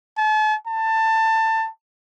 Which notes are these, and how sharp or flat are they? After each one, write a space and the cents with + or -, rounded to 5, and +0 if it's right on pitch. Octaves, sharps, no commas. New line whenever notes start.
A5 -40
A5 +20